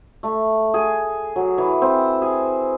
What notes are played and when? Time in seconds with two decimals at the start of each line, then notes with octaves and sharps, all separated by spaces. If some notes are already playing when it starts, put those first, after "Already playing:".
0.23 A3
0.74 G#4
1.36 F#3
1.58 E3
1.82 C4
2.22 G#4